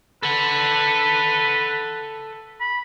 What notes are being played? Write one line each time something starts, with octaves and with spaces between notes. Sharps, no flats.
A4 B4 F#5
B5